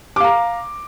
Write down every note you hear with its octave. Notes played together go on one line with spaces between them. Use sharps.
F5 A#5 D6